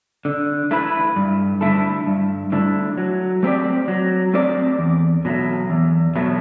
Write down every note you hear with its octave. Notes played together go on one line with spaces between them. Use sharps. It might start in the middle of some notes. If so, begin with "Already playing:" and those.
D3
A3 E4 B4
G2
D3 A3 E4 A4
G2
D3 A3 E4 A4
F#3
A3 C4 G4 D5
F#3
A3 C4 G4 D5
E2
B2 F#3 A3
E2
B2 F#3 A3